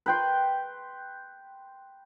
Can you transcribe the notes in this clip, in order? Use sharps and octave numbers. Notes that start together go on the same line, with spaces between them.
B4 G5 C6